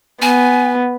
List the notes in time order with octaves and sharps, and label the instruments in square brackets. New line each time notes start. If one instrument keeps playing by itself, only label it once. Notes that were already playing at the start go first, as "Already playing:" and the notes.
[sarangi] B3 [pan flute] G#5